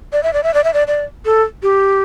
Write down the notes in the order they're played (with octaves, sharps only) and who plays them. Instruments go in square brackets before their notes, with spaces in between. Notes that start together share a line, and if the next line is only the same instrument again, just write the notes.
[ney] D5
E5
D5
E5
D5
E5
D5
D5
A4
G4